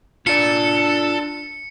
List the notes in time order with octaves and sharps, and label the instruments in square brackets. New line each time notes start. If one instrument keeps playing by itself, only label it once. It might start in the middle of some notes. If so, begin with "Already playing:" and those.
[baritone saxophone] D4 [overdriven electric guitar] F4 D5 [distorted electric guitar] A4 [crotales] C#7